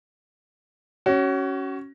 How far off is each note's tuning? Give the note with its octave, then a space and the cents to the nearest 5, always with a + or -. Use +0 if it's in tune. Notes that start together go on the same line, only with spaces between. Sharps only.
C#4 +0 F#4 +30